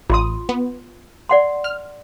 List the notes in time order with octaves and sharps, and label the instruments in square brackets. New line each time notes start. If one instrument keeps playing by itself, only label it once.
[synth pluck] A1 D#6 [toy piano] F4 C6
[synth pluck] B3
[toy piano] D5 F#5 C6
[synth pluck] F6